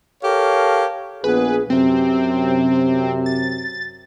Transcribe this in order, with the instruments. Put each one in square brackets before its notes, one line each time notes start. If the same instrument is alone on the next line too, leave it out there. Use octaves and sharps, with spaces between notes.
[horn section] G4 A4 A#4 C#5 F5
[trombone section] A#1 B3 G#4 [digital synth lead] B4
[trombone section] F#2 C3 [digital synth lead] C4
[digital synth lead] A6